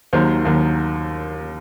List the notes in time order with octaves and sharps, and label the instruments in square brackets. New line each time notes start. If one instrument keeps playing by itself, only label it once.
[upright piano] D#2 D#3 F#3 C5
D#2 D#3 F#3